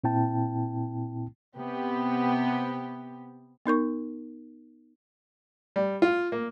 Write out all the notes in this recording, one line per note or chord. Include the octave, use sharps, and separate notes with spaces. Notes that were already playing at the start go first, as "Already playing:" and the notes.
A#2 C4 E4 G5 A5
C3 B3 G4
B3 D#4 A#4 C#6
G3
F4
A#3